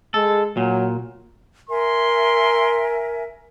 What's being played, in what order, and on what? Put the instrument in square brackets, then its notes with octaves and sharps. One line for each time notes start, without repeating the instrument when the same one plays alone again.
[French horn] G#3 [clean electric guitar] A4
[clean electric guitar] A#2 [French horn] F#3
[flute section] A#4 E5 G#5 [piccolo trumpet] C6